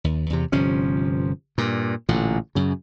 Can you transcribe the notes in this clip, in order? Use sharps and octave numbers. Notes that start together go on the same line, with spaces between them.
D#2
E2 C3
G1 C3 F3 C#4
G2 A#2
A1 A#2 D3
F#2 C#3